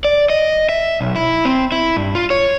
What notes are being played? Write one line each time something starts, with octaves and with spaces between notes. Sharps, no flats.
D5
D#5
E5
B1
E4
C4
E4
G2
F4
C#5